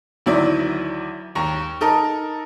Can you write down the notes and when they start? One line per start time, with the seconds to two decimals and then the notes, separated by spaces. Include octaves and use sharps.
0.26 D2 D#3 F#3 E4 D5
1.35 D#2 A#5 C#6
1.81 D#4 A4 A#4